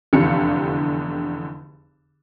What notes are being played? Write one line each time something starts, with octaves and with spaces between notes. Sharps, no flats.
F1 E2 D3 G4 F5 C#7